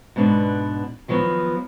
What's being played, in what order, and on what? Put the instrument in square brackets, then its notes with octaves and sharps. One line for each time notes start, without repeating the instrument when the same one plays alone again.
[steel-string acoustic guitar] G#2 B2 B3 D4
D#3 F3 F#3 B3